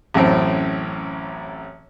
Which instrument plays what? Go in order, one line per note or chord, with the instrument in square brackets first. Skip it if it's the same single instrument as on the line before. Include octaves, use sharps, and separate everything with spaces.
[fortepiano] A1 F#2 A2 C4